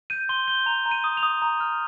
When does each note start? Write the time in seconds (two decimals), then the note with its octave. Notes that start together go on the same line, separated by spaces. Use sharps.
0.10 G6 D#7
0.29 C6 G7
0.47 G6 G7
0.66 A#5 F7
0.86 A#5
0.91 D#7
1.04 D#6
1.17 F7
1.23 D#6
1.42 A#5
1.60 F6